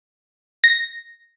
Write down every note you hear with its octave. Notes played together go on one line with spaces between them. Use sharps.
A#6